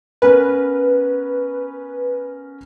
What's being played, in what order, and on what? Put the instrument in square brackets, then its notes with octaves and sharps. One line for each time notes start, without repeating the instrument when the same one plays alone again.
[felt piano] B3 C#4 A#4 [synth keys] B4